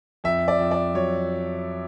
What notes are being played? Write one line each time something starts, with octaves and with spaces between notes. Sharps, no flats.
F2 E5
D5
F2
D5
F#3 C#5